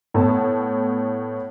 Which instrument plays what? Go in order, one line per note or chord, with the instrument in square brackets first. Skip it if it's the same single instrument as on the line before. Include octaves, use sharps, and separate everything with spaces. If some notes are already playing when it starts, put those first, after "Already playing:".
[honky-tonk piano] A2 B3 A5